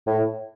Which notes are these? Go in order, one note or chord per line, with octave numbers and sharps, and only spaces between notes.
A2